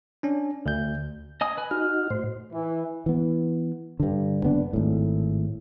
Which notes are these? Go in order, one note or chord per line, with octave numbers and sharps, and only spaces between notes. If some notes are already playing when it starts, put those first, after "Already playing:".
C#4 D4
D2 G6
D#5 G#5 D#6
B4 G#5
D#4 F#4 F6
A2 C5
E3
E3 B3
G2 D3
F#1 B3 D4
G#1 A2